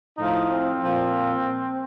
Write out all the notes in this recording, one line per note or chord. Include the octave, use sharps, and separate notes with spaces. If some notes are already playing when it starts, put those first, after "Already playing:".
A2 F3 D#4
C4
A#2 F3